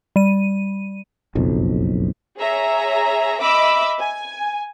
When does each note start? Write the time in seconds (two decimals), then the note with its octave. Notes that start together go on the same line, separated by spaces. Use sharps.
0.16 G3 D#7
1.35 F#1 B1 F2
2.38 G#4 C#5 E5 A#5
3.41 D#5 E5 B5 D6 E6
3.99 G#5